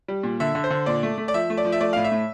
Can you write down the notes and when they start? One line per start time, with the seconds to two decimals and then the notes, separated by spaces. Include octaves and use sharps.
0.08 G3
0.23 A#2
0.40 D3 E5
0.55 D3
0.64 C5
0.70 D3
0.86 A#2 D5
1.03 A3
1.18 A3
1.28 D5
1.34 F3 E5
1.50 A3
1.57 D5
1.65 F3
1.72 E5
1.81 A3 D5
1.93 A2 F5
2.04 E5
2.12 A2